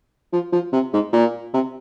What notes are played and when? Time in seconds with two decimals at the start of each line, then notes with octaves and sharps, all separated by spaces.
0.33 F3
0.53 F3
0.73 C3
0.93 G#2
1.13 A#2
1.54 C3